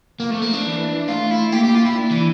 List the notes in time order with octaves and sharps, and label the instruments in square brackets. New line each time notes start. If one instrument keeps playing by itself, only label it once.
[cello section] F3 [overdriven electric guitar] A#3
[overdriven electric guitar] A3
A#3
D4
[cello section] E3
[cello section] A3 [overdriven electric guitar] F4
[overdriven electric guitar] E4
[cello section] A#3 [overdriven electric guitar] G4
[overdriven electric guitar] G4
F4
E4
[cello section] D4
[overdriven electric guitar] E3